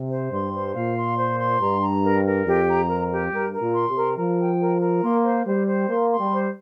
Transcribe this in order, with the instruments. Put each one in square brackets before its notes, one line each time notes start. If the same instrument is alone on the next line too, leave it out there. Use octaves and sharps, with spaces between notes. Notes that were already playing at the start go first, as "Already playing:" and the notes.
Already playing: [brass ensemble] C3
[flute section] C5
[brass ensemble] G2 [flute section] C6
[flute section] C5
[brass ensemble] A#2 [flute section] F5
[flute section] C6
C5
C6
[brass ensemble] G2 [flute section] A#5
[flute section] A#5
A#4
A#4
[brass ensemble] F2 [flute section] G4
[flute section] A#5
A#4
G4
[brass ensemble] G2 [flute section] A#4
[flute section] A#4
[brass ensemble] A#2
[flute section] C6
[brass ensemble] C3
[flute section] A#4
[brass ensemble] F3 [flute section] A#4
[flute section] G5
A#4
A#4
[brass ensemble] A#3 [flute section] C6
[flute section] C5
[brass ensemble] G3 [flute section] C5
[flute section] C5
[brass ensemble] A#3 [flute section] C6
[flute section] C6
[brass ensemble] G3
[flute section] C5